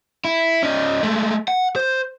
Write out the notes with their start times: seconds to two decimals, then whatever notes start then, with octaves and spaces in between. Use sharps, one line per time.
0.25 E4
0.63 C#4 D#4
1.03 G#3 A3
1.48 F#5
1.76 C5